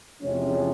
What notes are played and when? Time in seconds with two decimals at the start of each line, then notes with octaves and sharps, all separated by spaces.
0.21 E2 C3 F3 G#3 C#4